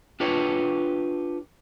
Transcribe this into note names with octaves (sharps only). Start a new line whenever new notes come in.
D4 F4 G4 B4 C#5